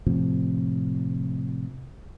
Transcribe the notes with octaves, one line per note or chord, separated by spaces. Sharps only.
A2 C3 F3